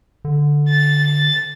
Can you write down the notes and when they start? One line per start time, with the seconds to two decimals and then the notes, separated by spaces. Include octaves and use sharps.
0.25 D3
0.70 A6